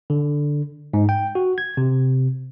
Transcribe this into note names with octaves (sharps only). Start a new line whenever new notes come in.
D3
G#2
G5
F#4
G#6
C3